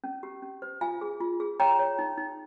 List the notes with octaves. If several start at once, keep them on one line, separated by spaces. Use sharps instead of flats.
C#4
G4
C#4
C5
F4 F5 G#5
G#4
F4
G#4
C#5 G5 A#5
C#5
D#4
D#4